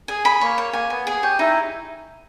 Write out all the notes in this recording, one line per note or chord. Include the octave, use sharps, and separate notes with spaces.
G#4 G#5
B5
A#3 C#5
C#5
A#3 G#5
B3 G#5
G#4 G#5
G4 C#5
D#4 E4